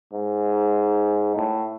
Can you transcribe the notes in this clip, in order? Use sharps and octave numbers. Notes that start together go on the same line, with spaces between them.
G#2
A2